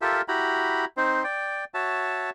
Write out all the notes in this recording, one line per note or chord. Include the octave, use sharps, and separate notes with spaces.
F4 G4 A4 A#4 E5
E4 F#4 G4 A#5 B5
C4 D#4 C5
D5 G5
F#4 C#5 E5 A5